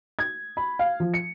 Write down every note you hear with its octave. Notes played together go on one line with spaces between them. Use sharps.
G#6
B5
F5
F3
C#7